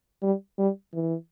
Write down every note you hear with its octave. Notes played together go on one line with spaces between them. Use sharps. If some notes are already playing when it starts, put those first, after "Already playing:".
G3
G3
E3